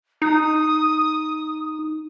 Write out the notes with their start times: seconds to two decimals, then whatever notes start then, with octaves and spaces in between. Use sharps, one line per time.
0.22 D#4 D#6